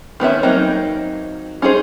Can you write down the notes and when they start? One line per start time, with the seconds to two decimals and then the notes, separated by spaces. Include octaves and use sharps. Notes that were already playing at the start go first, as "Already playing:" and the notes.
0.20 D#3 B3 C#4 E5
0.43 F#3 A#3 C4 D#4
1.62 C#4 D#4 G#4 C5